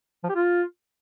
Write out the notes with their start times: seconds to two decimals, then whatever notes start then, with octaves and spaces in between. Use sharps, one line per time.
0.24 F3
0.29 G4
0.35 F4